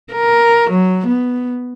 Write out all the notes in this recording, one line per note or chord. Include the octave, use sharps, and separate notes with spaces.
A#4
F#3
B3